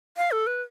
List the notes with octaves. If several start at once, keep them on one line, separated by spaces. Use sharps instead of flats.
F5
A4
B4